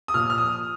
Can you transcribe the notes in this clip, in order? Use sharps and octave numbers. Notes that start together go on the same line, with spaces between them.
D#6
A#2 F3 F6
F6
D#6